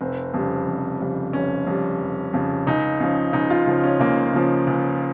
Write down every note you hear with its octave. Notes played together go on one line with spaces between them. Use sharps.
F1 C4
F2 C#3 G3
F1
F2 C#3 G3
F1 C#4
F2 C#3 G3
F1
F2 C#3 G3
C#2 D#4
C#3 F3
C#2 D#4
F4
C#3 F3
C#4
C#2 A#3
C#3 F3
C#2